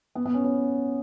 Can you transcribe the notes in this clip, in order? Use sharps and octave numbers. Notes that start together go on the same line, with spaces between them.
B3
B3
C#4
C#4